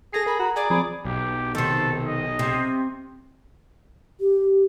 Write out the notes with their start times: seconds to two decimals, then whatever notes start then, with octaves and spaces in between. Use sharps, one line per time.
0.13 G#4 A4 G#5 A#6 C7
0.26 A#4 B5
0.39 F#4 A#5
0.55 G#4 D5
0.70 F3 C4 G#4 B5
1.05 B1 G4
1.55 C3 D#3 A4
2.05 D#5
2.39 C3
4.21 G4